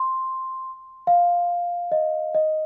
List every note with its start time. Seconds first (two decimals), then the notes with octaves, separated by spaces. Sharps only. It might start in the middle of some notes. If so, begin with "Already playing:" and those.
Already playing: C6
1.07 F5
1.92 D#5
2.35 D#5